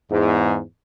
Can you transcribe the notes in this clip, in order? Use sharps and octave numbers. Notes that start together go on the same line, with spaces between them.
E2 G#2